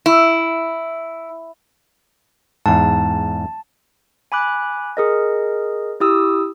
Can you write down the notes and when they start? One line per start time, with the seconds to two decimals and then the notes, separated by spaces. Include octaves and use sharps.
0.06 E4
2.66 E2 G#2 A5
4.32 G#5 B5 D6 F#6
4.97 G#4 A#4 D#5
6.00 E4 G4 D#6 E6